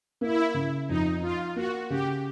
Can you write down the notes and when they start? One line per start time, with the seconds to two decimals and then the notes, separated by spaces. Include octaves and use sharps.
0.21 A#3 E4
0.54 C#3
0.88 F2 D#4
1.22 F3 F4
1.56 A#3 F#4
1.90 C#3 G4